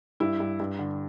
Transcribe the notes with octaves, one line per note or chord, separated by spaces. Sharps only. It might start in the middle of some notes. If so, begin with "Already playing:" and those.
G2 E4
G2
G2
D3